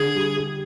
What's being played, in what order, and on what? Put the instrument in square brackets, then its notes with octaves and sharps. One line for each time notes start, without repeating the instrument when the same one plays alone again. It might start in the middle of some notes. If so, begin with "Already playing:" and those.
Already playing: [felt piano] D3 [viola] G#4
[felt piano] G3
G4